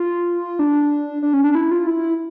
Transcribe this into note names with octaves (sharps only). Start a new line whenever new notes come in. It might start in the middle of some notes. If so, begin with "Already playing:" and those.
Already playing: F4
D4
D4
C#4
D4
E4
F4
E4